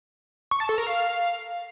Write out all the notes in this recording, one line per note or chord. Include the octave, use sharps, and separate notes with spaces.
C#6
A5
A4
A#4
F5